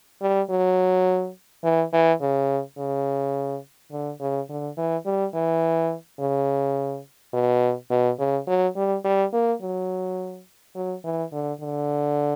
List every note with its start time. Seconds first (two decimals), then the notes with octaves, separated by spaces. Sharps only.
0.21 G3
0.50 F#3
1.64 E3
1.93 E3
2.21 C#3
2.78 C#3
3.92 D3
4.20 C#3
4.49 D3
4.77 E3
5.06 G3
5.34 E3
6.20 C#3
7.33 B2
7.90 B2
8.19 C#3
8.47 F#3
8.76 G3
9.05 G3
9.33 A#3
9.62 F#3
10.75 F#3
11.04 E3
11.32 D3
11.61 D3